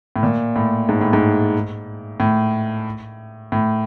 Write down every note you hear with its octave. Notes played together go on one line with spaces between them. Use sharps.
A2
A#2
A2
G#2
A2
G#2
A2
A2